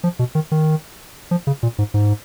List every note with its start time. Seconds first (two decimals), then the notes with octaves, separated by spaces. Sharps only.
0.04 F3
0.19 B2
0.35 D#3
0.52 D#3
1.31 F3
1.47 C#3
1.63 A#2
1.78 G#2
1.94 G#2